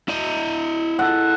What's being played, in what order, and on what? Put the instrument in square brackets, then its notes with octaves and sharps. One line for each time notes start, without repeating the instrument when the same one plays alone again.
[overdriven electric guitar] E4 D#5
[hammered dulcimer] A4 F#5